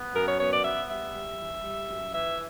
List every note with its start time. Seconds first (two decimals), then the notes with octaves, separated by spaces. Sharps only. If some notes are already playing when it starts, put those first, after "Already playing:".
Already playing: B3
0.15 F#2 A#4
0.27 C#5
0.39 B3 C#5
0.52 D5
0.64 B3 E5
0.88 G3 E5
1.13 G3
1.38 E3
1.63 G3
1.88 F#2
2.12 E3 E5